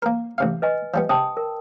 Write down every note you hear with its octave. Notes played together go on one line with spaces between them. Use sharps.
A#3 A#4
A1 C3 F5
B4 D#5 G#5
F3 G3 B3
C3 G5 A5 D#6
A#4